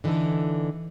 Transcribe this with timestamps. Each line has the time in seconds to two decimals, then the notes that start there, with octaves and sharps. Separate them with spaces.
0.04 D3 E3 D#4 E4 A4